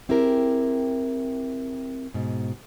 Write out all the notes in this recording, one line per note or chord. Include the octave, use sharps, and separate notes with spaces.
C4 E4 G4 G#4 A#4
G#2 B2